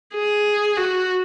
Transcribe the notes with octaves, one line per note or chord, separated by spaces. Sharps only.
G#4
F#4